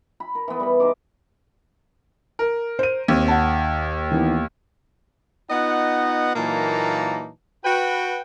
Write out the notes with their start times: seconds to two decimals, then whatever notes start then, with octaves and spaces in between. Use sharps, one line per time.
0.20 B5
0.35 A#4
0.48 E3 B3
0.60 G3 B5
0.80 D#4 G#4 C5 D6
2.39 A#4
2.79 C5 D#7
3.08 D#2 C4
3.28 F#5 A5
4.11 D#3 E3 B3
5.51 B3 D#4 F4 D#5 F#5
6.36 A#2 E3 F#3 A#3 D#4 A5
7.65 F#4 B4 G5